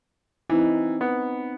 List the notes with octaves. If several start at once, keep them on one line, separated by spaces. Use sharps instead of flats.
E3 C4 D#4
B3